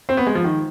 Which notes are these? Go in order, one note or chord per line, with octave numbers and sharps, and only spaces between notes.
C4
B3
G#3
F3
D#3